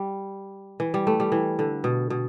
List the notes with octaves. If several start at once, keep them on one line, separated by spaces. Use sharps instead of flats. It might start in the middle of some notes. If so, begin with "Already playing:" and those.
Already playing: G3
E3
G3
A3
G3
E3
D3
B2
B2